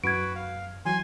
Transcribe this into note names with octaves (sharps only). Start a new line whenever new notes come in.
F#2 F#4 B4 G#6 D7
F5
E3 F#3 G#5 C6